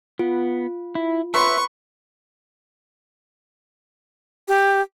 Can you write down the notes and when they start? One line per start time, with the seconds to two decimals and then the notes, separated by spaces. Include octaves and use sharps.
0.19 B3 F4
0.95 E4
1.34 B4 E5 C6 C#6
4.48 G4